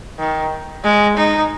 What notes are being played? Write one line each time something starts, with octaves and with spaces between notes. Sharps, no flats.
D#3
G#3
D#4